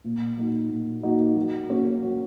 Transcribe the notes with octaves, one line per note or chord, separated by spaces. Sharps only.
A#2
F#3 A#3 D#4 F#4
A#2
F#3 A#3 D#4 F#4
F#3
A#3 C#4 F#4
F#3